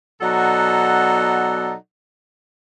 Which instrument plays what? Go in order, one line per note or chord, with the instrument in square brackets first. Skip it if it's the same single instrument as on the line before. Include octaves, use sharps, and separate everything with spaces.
[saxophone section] B2 F#3 D#4 A4 D5 F#5